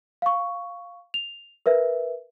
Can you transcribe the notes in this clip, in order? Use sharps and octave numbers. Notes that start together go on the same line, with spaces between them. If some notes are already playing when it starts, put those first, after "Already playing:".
F5 C#6
F7
A#4 B4 E5